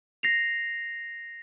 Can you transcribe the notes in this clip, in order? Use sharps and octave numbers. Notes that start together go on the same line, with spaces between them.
A#6 C7 F7